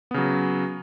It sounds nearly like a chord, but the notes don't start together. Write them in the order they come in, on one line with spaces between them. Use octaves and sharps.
B3 C#3 F#3